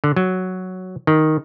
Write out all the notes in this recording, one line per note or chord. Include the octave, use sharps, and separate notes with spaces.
D3
F#3
D#3